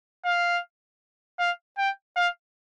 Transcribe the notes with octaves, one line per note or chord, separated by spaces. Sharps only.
F5
F5
G5
F5